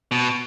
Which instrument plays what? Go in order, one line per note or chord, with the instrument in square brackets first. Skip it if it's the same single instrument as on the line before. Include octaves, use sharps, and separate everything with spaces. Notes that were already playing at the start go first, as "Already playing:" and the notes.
[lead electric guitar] B2